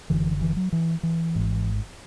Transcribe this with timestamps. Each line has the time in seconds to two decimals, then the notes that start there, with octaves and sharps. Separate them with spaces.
0.10 F#1 F#2 D3 E3
0.41 E3
0.57 F#3
0.72 E3
1.03 E3
1.36 G#1 G#2